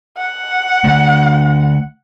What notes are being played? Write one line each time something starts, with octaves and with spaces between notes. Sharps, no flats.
F#5
D3 A3